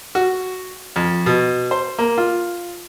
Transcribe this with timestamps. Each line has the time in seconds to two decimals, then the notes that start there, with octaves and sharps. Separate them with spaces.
0.15 F#4
0.96 F2
1.26 B2
1.71 C5
1.98 A#3
2.18 F4